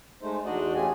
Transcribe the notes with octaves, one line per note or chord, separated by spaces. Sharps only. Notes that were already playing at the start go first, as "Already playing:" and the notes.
G#3 A3 D#4 C5
E2 D4 D#4 F#4 D5 D#5
A3 C#4 F4 G4 G#5